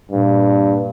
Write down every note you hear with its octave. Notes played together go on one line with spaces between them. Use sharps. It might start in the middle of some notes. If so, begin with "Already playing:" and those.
G2 A#2